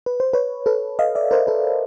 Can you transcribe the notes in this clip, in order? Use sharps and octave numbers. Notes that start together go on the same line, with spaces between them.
B4
C5
B4 C#5
A4 B4
D#5 F5
D5 E5
A#4 C5
A4 B4